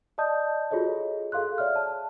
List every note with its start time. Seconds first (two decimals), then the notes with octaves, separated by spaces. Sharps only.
0.18 D5 D#5 A5 D#6 G6
0.71 F4 F#4 G#4 A4 C#5 D#5
1.32 G#4 A4 F5 C6 F#6
1.58 C#5 D5 E5 F6
1.76 A5